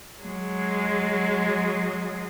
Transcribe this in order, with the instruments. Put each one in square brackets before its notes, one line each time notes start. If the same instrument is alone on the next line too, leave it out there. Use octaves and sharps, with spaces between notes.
[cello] F#3 G#3